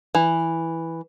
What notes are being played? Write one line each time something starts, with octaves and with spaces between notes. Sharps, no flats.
E3